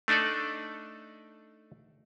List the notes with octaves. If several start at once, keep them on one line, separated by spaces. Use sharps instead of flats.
A3 D4 D#4 A4 D5